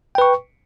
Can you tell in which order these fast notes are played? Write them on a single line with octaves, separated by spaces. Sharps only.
G5 B4 C#6